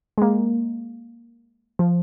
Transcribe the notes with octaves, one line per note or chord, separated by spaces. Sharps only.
G#3
A#3
F3